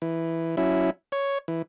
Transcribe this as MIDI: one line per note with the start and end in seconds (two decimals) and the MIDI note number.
0.02 0.56 52
0.57 0.90 54
0.57 0.90 61
0.57 0.90 64
1.12 1.38 73
1.48 1.62 52